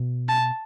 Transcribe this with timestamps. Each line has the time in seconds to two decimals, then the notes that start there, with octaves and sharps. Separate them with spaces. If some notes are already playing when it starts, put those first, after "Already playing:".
Already playing: B2
0.29 A5